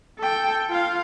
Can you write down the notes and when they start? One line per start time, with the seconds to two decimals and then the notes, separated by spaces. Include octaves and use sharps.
0.19 A4 G5
0.70 F4 F5